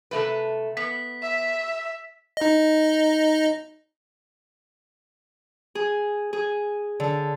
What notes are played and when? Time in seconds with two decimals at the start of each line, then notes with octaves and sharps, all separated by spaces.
0.11 C3 A3 B4
0.77 B3 B6
1.22 E5
2.37 D#4 D#5
5.75 G#4
6.33 G#4
7.00 D3